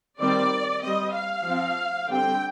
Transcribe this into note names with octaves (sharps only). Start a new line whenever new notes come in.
D#3 G3 C4 D5
G3 C4 D#5
F5
F3
C4
D3 G3 C4 G5